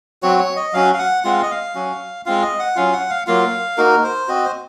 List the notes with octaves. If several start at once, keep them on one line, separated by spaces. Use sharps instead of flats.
F#3 C4 F#4 C#5
C#5
D#5
F#3 C#4 F#4 F5
F5
F#5
G#3 C4 F4 F#5
F5
D#5
F5
F#3 C#4 F#4
G#3 C4 F4 F5
D#5
F#5
F#3 C#4 F4 F5
F#5
F5
F#3 A#3 F4 F5
A#3 D#4 F#4 A#4
C5
C4 F#4 D#5
C5